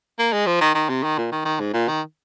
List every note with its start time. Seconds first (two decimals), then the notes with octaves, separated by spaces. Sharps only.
0.19 A#3
0.33 G#3
0.47 F3
0.61 D#3
0.75 D#3
0.89 C3
1.03 D#3
1.18 A#2
1.32 D#3
1.45 D#3
1.60 G#2
1.74 A#2
1.88 D#3